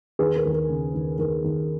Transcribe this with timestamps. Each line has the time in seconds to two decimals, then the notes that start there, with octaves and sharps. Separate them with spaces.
0.19 D#2 G#4 B4
0.36 A#4
0.45 D#2
0.53 A#4
0.69 C#3
0.94 D#2
1.19 D#2 A#4
1.44 D#2